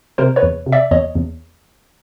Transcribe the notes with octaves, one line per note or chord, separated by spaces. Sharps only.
C3 A#4 C5
B4 C#5
E2
C3
D5 E5
E2 C#5 D#5
E2